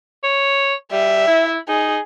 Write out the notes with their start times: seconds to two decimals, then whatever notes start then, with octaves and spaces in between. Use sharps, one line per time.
0.24 C#5
0.92 G3 E5
1.27 E4
1.68 D#4 G#4